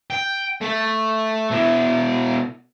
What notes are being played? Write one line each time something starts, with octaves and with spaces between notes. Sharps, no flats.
G5
A3
B2 E4